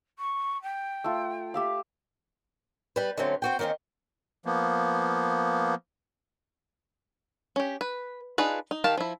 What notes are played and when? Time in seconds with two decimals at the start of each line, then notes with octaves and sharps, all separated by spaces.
0.18 C#6
0.62 G5
1.04 A3 F4
1.54 G4 E5 F5
2.96 G3 B4
3.17 D3 F#3 A3 C4 C#4
3.42 C4 F#4 G5
3.59 D#3 A#3 C4 C#4 D#4
4.46 F3 A#3 B3
7.56 C#4 G4
7.81 B4
8.38 D4 D#4 F4 G#4 B4
8.71 D#4
8.84 D#3 G4 F5 A5
8.97 F3 E4